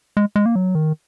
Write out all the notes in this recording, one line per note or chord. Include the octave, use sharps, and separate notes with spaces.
G#3
G#3
A#3
F#3
D#3